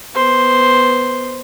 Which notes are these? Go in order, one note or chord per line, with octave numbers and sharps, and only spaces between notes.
B3 C5